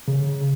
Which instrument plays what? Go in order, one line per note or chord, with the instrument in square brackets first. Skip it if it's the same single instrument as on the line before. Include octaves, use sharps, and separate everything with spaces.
[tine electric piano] C#3